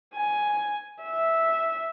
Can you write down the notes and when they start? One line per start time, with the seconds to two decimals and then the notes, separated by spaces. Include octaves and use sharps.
0.14 G#5
1.03 E5